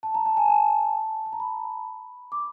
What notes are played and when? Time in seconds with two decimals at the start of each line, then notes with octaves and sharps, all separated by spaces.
0.03 A5
0.15 A#5
0.26 A5
0.37 G#5
0.48 A5
1.26 A5
1.33 A#5
1.40 B5
2.32 D6